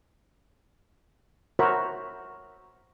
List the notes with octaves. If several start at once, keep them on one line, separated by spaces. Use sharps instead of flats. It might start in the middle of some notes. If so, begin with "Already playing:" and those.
F#4 A#4 C5 C#5 E5 B5